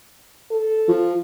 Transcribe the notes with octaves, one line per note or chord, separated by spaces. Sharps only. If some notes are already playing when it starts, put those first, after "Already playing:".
A4
F3